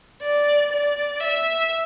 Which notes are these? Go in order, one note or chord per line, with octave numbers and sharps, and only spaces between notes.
D5
D5
E5